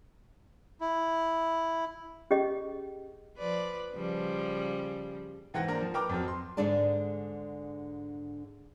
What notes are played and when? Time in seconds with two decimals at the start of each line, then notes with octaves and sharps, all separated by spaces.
0.81 E4
2.31 C#4 G4 G#4 D#5
3.38 F3 B4 D5
3.94 C#3 F3 G3
5.54 G#2 E3 C5 F#5 G5 A#6
5.68 A#3 D4 A#4 C5
5.81 F3
5.94 A#4 B4 G5 A#5 D6 F6
6.09 F2 F#3 C4
6.28 C6
6.57 G#2 D3 G#3 D4 D5 A5